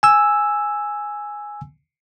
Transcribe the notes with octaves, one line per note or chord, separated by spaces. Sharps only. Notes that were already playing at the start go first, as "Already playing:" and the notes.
G#5 E6